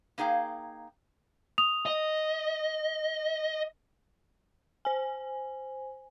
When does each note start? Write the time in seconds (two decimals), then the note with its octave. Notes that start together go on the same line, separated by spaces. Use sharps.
0.18 A#3 D#4 G#4 F5 G5
1.58 D#6 F7
1.86 D#5
4.85 C5 G#5